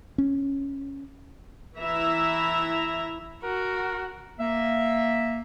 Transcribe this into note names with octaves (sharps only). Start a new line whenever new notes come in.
C#4
E3 E4 E5 A#5
F#4 A#4
A#3 E5